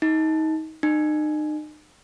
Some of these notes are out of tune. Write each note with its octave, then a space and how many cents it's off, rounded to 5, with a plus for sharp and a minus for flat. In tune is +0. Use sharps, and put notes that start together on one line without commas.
D#4 +25
D#4 -40